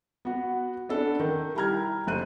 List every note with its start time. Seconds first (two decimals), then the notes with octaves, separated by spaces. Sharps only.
0.25 B3 F#4
0.89 B3 C#4 D4 A4
1.20 D#3
1.55 G3 E4 G4 A#5 F6 G#6
2.07 F#1 A3 C5 F#6 D#7